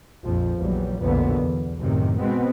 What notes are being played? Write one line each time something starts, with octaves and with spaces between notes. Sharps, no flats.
A#1 F2 F3
A#1 E2 F#3 G3
B1 F2 A#2 D3 B3
E2
F#2 A2 C3 D#3
B2 G#3 B3 C4